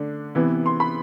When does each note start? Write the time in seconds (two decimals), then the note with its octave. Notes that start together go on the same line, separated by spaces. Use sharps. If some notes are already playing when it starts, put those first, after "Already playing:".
Already playing: D3 A3 D4
0.35 C3 E3 B3 E4
0.66 C6
0.80 B5